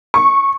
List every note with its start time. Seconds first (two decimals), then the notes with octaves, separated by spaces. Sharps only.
0.14 C#6